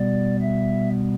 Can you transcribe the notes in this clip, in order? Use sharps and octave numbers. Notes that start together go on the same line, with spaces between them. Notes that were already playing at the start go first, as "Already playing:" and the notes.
Already playing: B2 G3 B3 D5
E5